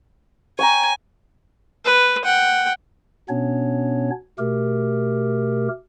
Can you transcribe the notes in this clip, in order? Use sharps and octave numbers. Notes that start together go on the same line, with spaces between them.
C#5 G5 G#5 A#5
B4
F#5 G5
B2 B3 C#4 D4 C#5
B2 A3 G4 A#4